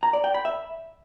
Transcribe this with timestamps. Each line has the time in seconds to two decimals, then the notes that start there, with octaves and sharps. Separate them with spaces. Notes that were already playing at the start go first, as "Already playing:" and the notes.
0.03 A#5
0.13 D5
0.24 G5
0.34 B5
0.45 E5